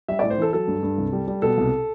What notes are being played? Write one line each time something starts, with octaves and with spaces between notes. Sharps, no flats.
G3 E5
A2 D5
C5
E3 A4
F#3 A4
G2
G2
C2
G3
G3
B2 A4
C2